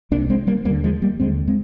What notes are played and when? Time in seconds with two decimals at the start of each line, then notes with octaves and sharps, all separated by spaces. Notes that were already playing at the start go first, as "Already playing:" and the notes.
0.11 C2 C3 A#3 D4
0.30 G#3 C4
0.47 G3 A#3
0.65 D#2 D3 G3 A#3
0.84 F3 G#3
1.02 G3 A#3
1.20 D#2 D3 G#3 C4
1.47 G#3 C4